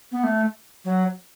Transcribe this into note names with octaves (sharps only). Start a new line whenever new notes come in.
B3
A3
F#3